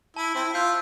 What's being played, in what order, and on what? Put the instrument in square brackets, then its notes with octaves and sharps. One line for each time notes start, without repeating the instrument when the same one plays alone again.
[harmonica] E4 [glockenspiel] A5
[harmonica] C4 E4
[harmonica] F4 [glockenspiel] E6 G6 C7